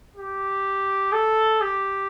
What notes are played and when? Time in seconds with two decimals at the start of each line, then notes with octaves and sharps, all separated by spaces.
0.16 G4
1.12 A4
1.61 G4